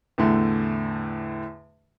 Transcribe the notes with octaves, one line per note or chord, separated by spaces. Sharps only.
E2 A2 D3 A3